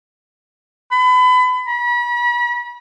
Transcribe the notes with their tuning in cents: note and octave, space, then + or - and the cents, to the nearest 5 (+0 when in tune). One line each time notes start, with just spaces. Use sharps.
B5 +30
B5 -40